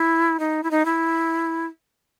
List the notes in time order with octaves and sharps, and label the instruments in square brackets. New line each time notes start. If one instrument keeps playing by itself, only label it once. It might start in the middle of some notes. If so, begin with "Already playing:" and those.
Already playing: [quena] E4
D#4
E4
D#4
E4